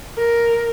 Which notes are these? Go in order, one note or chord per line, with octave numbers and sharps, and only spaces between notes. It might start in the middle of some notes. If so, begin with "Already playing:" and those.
A#4